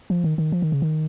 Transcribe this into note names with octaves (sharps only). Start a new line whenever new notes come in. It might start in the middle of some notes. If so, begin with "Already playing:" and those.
F3
D#3
D#3
F3
D#3
C#3
D#3